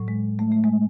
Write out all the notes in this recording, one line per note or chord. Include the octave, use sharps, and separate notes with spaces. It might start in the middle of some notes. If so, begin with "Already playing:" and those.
Already playing: A2 F#3
G#3
A3
A3
G#3